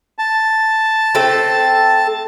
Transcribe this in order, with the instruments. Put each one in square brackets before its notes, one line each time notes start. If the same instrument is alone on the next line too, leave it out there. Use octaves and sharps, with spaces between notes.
[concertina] A5
[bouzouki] A3 C4 A4